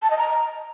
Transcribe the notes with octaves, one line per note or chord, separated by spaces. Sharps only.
A5
D#5
A#5